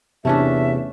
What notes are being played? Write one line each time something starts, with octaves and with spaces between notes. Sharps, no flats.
E2 C3 A3 C#4 D4 E5